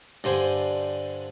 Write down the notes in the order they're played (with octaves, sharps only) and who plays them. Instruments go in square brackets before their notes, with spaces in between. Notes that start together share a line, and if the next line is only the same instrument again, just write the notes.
[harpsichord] G2 D3 C5 G#5